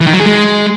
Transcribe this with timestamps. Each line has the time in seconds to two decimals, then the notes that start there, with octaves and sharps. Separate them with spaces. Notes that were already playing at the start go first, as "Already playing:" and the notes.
0.01 E3
0.07 D#3
0.13 F#3
0.20 G#4
0.26 G#3